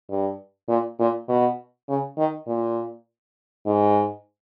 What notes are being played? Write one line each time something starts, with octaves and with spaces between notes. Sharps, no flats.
G2
A#2
A#2
B2
C#3
D#3
A#2
G#2